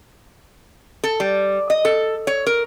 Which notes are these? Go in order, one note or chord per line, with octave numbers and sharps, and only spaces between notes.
A4
G3
D#5
A4
C#5
A#4